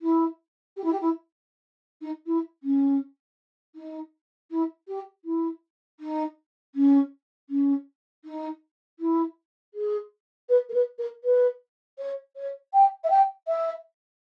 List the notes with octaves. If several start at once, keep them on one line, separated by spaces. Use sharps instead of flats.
E4
G4
E4
G4
E4
D#4
E4
C#4
D#4
E4
G4
E4
D#4
C#4
C#4
D#4
E4
G#4
B4
A#4
B4
A#4
B4
C#5
C#5
G5
E5
G5
E5